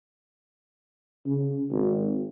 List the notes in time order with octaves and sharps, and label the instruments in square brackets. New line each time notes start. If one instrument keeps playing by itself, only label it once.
[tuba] C#3
G#1